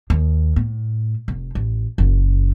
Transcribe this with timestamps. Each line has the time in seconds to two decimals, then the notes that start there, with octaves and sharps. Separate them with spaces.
0.10 D#2
0.56 A2
1.28 F1
1.55 A1
1.98 F#1 F#2